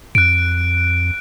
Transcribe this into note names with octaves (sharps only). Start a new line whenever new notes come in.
F2 F#6 D7